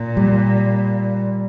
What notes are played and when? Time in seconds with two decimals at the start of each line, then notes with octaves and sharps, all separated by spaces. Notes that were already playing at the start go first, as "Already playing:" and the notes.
Already playing: A#2
0.17 G3